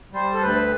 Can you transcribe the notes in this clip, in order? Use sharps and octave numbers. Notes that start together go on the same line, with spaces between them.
G3 C5
A4
D2 B4